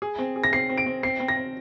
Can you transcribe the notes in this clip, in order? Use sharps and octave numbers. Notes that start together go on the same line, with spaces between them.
G#4
C4
G#4
A#6
C4 C7
C4
D7
C4
C4 C7
C4
A#6
C4